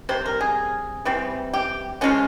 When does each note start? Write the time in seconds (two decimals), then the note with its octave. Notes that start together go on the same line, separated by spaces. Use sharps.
0.09 C3 G3 C5
0.26 A#4
0.41 G#4
1.05 E3 G3 C4
1.53 G4
2.01 F3 G#3 C#4 F4